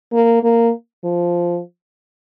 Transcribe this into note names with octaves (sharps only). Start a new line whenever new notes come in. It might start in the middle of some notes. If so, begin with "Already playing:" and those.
A#3
A#3
F3